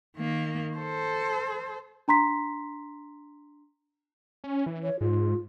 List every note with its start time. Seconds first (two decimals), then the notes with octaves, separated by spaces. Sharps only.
0.16 D#3 A#3
0.77 A4 C5
2.08 D4 A#5 C6 B6
4.44 C#4
4.66 E3
4.83 C#5
5.01 G#2 F4